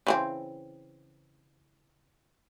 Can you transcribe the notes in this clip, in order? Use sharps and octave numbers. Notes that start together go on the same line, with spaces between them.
C#3 E3 C4